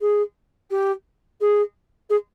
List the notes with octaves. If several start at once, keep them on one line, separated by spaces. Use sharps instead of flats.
G#4
G4
G#4
G#4